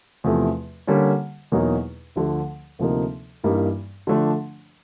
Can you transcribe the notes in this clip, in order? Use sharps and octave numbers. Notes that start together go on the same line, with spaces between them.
E2 C3 F3 A3
D3 G3 A#3 C#4
E2 B2 F#3 A#3 D#4
D2 D3 F3 A3
D2 C3 F3 A#3 D#4
G2 E3 G3 A#3 D#4
D3 F3 A3 D4